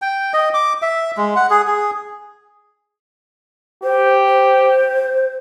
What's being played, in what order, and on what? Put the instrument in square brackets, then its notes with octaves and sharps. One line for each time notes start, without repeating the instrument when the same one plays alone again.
[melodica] G5
D#5
D6
E5
G#3
F#5
G#4
G#4
[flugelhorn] G4 [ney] C5
[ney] C5